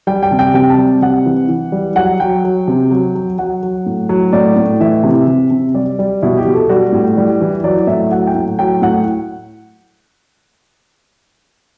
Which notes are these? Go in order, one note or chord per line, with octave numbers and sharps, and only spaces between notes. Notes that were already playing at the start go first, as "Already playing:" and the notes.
G3 G5
G5
C3
G5
C3 G5
A5
G3
C3 F#5
E3
E3
G3
F#3 F#5
F#3 G5
F#3
C3
F#3
F#3
F#3 F#5
F#3
A2
F#3
A2 D5
A2
E3 E5
C3
C3
C3
G3 D5
G3
B2 E4
G4
B2
A4
G3 F#4
A2
G3
E3
F#3 D5
A2 E5
F#3 F#5
G5
A2
F#3 G5
A2 F#5